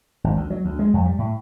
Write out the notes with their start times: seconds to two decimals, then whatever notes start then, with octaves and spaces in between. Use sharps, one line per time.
0.24 G#1
0.37 D2
0.50 F#3
0.65 D2
0.79 G#3
0.93 F2
1.06 G3
1.18 A2